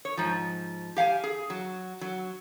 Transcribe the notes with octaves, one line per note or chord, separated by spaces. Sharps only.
C#5
G#2 F3
G4 F5 F#5 G#5
G#4
F#3
F#3